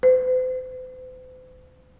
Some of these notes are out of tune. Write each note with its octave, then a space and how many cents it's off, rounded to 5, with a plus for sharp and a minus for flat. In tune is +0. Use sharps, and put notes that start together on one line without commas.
C5 -45